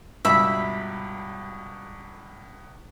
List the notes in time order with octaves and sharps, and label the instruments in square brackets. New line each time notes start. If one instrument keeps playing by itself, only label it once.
[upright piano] C#2 G2 B2 [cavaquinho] E5 B5